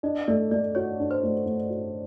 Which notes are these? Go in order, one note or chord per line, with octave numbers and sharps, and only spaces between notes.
D4 D#5
A3 D5
A3 D5
F#4 C#5
D4
C5
A3
A3
F#4